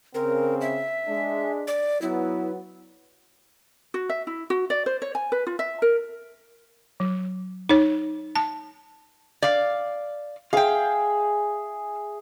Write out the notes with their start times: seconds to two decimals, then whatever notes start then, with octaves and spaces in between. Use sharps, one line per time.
0.14 C#3 C4 A#4
0.61 E5
1.07 G#3 D4
1.67 D5
2.02 F#3 B3 E4
3.94 F#4
4.09 E5
4.27 E4
4.50 F#4
4.70 D5
4.86 C5
5.02 C#5
5.15 G#5
5.32 B4
5.47 F4
5.59 E5
5.82 A#4
7.00 F#3
7.69 D#4 C#5
8.36 A5
9.42 D5 F5
10.53 G#4 E5 F5 G5 G#5